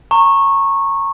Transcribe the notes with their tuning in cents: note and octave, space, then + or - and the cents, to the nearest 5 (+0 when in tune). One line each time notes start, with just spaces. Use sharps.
A#5 -25 C#6 -15